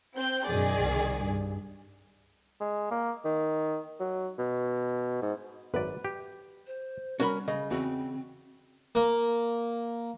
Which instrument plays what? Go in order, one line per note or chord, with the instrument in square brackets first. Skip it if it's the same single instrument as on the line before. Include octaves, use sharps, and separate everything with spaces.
[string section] C4 G6
[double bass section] F#2 B2 [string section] D#3 G#4 D5
[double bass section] C2
G2
[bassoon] G#3
A#3
D#3
F#3
B2
G#2
[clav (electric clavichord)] G#1 F#2 D5 [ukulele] B4
[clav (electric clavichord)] G4
[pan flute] C5
[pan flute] G3 [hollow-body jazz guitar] C#4 A#4 B5 [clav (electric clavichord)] F#4
[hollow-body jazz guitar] C#3 [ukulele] D#5
[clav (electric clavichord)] E2 [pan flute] C4 [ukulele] F#4
[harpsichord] A#3